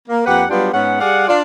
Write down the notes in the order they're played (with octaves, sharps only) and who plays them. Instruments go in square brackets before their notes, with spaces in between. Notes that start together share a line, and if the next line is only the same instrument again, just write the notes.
[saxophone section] A#3
F2 A#3 G4 B4 F#5
F#3 G3 B3 D4 F4 G4
G#2 B3 C#4 G#4 F#5
G3 G#4 D5 F5 F#5
D4 F4 D5